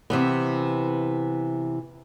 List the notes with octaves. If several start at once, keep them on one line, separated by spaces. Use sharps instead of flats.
C3 E3 B3